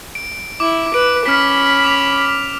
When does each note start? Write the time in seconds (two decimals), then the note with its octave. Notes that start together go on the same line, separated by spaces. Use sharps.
0.15 D7
0.60 E4 D6
0.94 B4 D7
1.26 C#4 B5 F6 B6
1.84 D6 F7